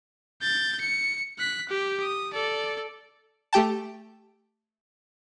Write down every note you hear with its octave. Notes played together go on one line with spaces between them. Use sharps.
G6 A6
C#7
F#6 B6
G4
D#6
A4 D5
A3 G4 G5 A5